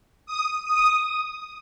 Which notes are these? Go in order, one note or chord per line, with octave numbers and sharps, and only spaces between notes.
D#6
D#6